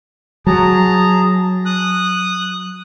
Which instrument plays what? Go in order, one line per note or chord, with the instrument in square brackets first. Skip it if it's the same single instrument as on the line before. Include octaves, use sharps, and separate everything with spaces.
[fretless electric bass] F#3 [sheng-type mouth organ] G#4 A5 A#5
[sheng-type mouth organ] D#6 F#6